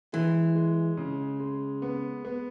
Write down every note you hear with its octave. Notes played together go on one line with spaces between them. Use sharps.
E3 G#3
G#3
C#3
G#3
B3
B3